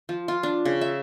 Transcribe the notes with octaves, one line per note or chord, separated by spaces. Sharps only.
F3
F4
D4
C#3
E5